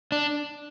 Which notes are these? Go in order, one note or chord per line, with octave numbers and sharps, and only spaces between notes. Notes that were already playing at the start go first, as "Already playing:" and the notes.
D4